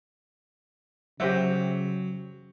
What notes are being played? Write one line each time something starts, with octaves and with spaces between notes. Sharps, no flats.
C#3 F#3 G4 C5 E5